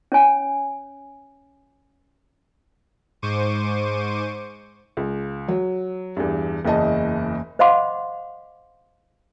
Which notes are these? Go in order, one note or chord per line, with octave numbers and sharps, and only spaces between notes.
C#4 C#5 G#5
G#2 C5 C#6 D6 D#7
C#2
F#3
E2 G2
F#1 E2 D#5 A5
C5 D#5 F5 F#5 C6 D6